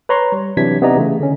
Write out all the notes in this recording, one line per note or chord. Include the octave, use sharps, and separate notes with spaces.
B4 C#5 A#5 C6 C#6
G3
C3 E3 F#3 D4 G#6 B6
C3 B3 D#4 D5 D#5 A#5
C#3 E3 A3
D3 C#4